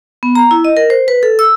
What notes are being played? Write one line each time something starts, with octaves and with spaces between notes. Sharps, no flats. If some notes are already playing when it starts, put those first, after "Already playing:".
B3
A#5
E4
D#5
A#4
C5
B4
A4
E6